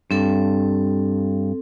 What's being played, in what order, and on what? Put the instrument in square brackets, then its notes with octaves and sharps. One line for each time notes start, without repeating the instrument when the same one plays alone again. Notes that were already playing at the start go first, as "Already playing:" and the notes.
[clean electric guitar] G2 [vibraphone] C4 A4